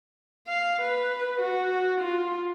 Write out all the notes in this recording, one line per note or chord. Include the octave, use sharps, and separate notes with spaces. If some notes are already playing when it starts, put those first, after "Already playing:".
F5
B4
F#4
F4